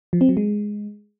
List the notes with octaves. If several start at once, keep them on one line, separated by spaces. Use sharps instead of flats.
F3
C4
F#3
G#3